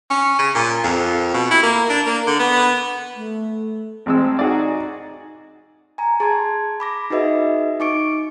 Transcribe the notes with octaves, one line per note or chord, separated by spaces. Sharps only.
C#4
C#3
A#2
F2
B2
E4
A#3
D4
A#3
D3
B3
A3
A1 G#3 C4 E6
D#4 F#4 G#4 D5
G#5 A#5
G#4 A5 C6 G#6
B5 D6 A#6
D#4 F#4 G#4 B4 D#5 E5
D#4 C#6 D6 C#7 D7